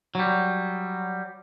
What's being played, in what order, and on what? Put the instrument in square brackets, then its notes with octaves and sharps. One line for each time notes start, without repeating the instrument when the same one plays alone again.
[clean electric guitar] F#3 G3